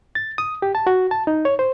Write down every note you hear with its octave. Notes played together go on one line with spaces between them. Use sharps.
A6
D#6
G4
A5
F#4
A5
D#4
C#5
C5